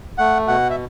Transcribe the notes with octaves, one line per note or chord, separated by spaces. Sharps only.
A3 F#5
B2 F#5
E5